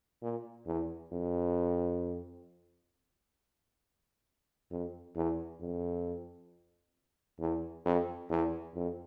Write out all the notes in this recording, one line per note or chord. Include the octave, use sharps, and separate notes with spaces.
A#2
E2
F2
F2
E2
F2
E2
F2
E2
F2